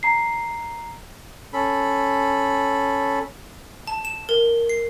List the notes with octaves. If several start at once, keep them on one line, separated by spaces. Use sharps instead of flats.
A#5 C7
C#4 A4 B5
A5
E7
A#4
C7